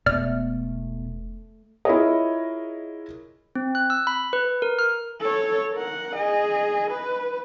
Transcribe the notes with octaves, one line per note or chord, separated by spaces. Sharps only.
E1 B2 A3 B3 C#4 D5 F6
E4 F4 G#4 A#4 C#5 D#5
C4
F#6
E6
B5
B4
A#4
F6
A4 C#5
A#4 F#5
G#4 D#5
B4